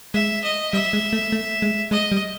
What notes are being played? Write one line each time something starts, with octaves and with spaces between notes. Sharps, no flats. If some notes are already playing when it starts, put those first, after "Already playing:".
G#3 E5
D#5
G3 E5
G#3
A3
A3
G#3
G#3 D#5
G3